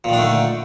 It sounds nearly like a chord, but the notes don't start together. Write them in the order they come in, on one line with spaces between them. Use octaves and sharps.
A#2 D#3 D4 A3 D3